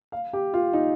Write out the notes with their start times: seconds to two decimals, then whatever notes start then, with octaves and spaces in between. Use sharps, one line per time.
0.12 F5
0.33 G4
0.54 F4
0.73 D#4